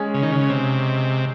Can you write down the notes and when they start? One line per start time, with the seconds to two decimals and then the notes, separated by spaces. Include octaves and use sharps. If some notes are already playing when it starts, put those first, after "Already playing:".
Already playing: G#3 C#4 G#4 C#5
0.14 C#3
0.23 D#3
0.32 C#3
0.49 C3